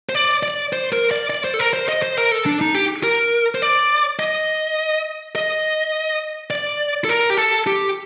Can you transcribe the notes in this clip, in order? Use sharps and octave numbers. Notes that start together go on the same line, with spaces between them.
C5
D5
D5
C5
A#4
D5
D5
C5
A4
A#4
C5
D#5
C5
A#4
A4
D4
D#4
G4
A#4
C5
D5
D#5
D#5
D5
A4
A#4
G4
A4
G4